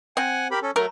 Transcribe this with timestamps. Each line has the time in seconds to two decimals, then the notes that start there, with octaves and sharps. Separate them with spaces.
0.17 C4 F#5 G#5
0.51 G4 A#4 B5
0.63 C#4 A4
0.76 F#3 A3 A#4